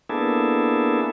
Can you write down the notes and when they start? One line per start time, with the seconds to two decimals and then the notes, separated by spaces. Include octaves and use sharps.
0.09 A#3 B3 D4 E4 G#4 A4